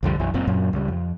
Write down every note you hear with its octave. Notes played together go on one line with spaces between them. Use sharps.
C2 F2 D3 G3
B1 F#2 E3
F1 F#2 A#2 C4
F#2 A#2 F#3
C#2 G3
F2